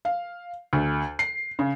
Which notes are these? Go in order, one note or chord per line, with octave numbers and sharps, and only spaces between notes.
F5
D2
C7
C#3